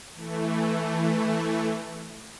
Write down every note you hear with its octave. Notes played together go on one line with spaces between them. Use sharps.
E3 A3